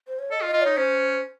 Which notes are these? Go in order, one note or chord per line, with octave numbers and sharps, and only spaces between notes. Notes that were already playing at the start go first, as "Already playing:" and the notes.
C5
C#5
A4 D#5
F4
D#5
F4
D#4 C#5
C#4 C5